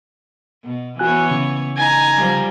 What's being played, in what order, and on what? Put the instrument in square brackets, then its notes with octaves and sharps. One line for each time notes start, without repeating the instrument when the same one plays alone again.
[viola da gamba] B2
[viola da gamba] E3 B3 C#5 [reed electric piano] F#4 G#5 F#6
[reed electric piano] C#3
[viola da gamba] D#4 [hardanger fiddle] G#5 A#5
[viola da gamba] F3 G3